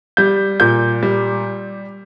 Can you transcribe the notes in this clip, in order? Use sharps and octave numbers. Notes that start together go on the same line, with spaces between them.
G3 G6
A#2 G6
G3